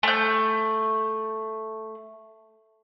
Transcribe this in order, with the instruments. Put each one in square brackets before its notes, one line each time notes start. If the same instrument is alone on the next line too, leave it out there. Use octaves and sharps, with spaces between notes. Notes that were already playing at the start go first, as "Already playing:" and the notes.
[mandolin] A3 G6